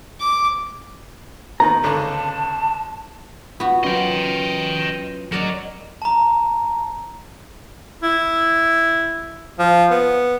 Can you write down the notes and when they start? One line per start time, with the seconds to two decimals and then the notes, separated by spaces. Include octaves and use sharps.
0.20 D6
1.60 D#3 B3 A#5
1.84 G#1 C#2 D3 A5
3.60 B3 D#4 F4 F#4
3.84 F#3 C#4 F4 B4 D#5 G5 C6
5.32 F#3 A#4 D5 D#5
6.02 A5 A#5
8.03 E4
9.59 F3
9.91 B3